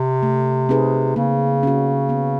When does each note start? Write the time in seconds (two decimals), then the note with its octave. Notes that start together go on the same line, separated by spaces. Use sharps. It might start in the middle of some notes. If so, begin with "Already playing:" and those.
Already playing: C3
0.23 A3
0.69 C4 D#4 G#4 B4
1.16 C#3 A#3
1.63 C#4 F#4
2.09 B3